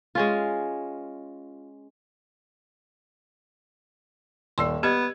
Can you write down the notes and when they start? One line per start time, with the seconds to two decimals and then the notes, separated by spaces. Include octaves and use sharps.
0.15 G#3 C#4 F4
4.58 D#1 D5 C6 E6
4.83 B3 G4 D#5 G#6